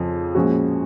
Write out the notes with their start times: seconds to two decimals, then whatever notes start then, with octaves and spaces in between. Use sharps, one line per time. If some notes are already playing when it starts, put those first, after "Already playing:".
Already playing: F2 C#3 F3
0.35 A#2 F3 G#3 C#4 F#4